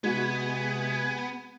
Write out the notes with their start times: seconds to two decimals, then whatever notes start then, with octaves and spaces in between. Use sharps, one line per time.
0.04 C3 G#3 B3 F#4 G#5